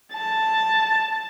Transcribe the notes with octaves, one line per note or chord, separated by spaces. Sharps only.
A5